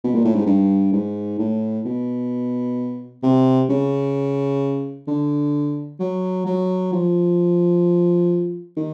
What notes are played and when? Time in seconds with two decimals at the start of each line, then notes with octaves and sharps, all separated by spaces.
0.04 B2
0.15 A#2
0.25 A2
0.36 G#2
0.47 G2
0.93 G#2
1.39 A2
1.85 B2
3.23 C3
3.69 C#3
5.08 D3
6.00 F#3
6.46 F#3
6.93 F3
8.77 D#3